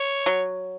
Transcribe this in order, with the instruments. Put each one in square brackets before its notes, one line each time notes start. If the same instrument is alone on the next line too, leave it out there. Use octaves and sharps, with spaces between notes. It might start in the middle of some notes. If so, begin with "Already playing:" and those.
Already playing: [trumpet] C#5
[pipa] F#3